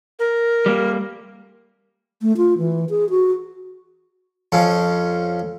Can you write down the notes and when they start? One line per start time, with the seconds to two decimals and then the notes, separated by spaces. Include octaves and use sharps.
0.19 A#4
0.66 G3 A#3
2.22 A3
2.37 F4
2.58 E3
2.90 G#4
3.10 F#4
4.52 F2 F3 C#4